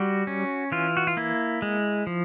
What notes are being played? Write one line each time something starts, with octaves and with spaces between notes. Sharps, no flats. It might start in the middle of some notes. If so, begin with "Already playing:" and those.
Already playing: G3 F#4
C#4
E3 F4
F#4
F4
A#3 E4
G#3
F3